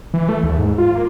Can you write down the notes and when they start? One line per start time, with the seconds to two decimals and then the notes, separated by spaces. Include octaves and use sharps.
0.14 E3
0.29 A3
0.43 D#2
0.57 G#2
0.78 F4
0.95 A#3